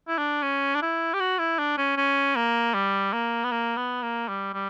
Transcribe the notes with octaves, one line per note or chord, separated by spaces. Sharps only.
E4
D4
C#4
D4
E4
G4
F#4
E4
D4
C#4
C#4
A#3
G3
A#3
B3
A#3
B3
A#3
G3
G3